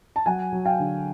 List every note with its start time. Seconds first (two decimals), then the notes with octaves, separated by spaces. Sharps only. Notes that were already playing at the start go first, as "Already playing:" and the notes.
0.16 A5
0.26 F#3 F#5 G#5
0.52 F#3
0.65 F5 G5
0.80 D3